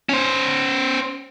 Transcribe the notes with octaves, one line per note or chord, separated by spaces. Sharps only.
C#4 C5